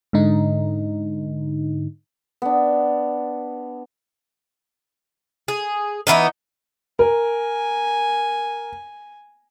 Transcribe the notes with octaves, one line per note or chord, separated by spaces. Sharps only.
G#2 D3 D#4
B3 D4
G#4
E3 F3 B3 D#4
A#4 G#5